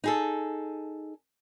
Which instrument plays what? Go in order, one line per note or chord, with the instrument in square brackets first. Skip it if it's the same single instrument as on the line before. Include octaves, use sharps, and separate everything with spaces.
[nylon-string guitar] D#4 G#4 A4